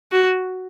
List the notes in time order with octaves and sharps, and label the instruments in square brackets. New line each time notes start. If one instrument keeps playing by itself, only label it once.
[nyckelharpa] F#4